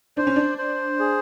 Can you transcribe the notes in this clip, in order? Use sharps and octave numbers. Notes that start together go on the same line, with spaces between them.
D4 C5
C#4
D4
C5
G#4